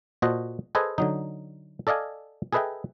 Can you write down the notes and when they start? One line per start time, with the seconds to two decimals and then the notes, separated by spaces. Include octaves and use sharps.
0.22 A#2 F#4 C5 D#5 A5
0.75 G#4 A4 B4 C5 D#5 G#5
0.98 D3 F#3 D#4
1.87 A4 D5 D#5 F5 G#5
2.53 G#4 A4 B4 D#5 E5 G5